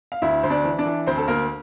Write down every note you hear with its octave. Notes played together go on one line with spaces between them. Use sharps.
F5
D2 E4 E5
D2 C5
D4 D5
E3
D4 D5
E3
D2 C4 C5
A4
D2 A#3 A#4